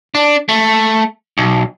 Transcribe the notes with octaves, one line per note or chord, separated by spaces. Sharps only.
D4
A3
B1